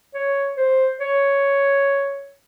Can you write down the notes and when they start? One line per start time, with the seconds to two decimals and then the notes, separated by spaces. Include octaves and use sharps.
0.14 C#5
0.57 C5
1.00 C#5